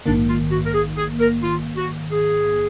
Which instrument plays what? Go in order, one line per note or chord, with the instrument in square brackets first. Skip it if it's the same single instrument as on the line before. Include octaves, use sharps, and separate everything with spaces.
[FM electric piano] A#1 G#2 D#3 A#3 [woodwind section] D4
[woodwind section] F4
F#4
A#4
G#4
G#4
A#4
F4
F#4
G#4